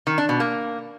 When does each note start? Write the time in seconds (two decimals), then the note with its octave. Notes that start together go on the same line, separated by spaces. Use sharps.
0.07 D#3
0.18 D4
0.29 B2
0.40 A#3